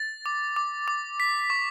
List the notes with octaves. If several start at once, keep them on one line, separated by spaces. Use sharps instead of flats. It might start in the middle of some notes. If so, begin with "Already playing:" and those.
Already playing: A6
D6
D6
D6
B6
C#6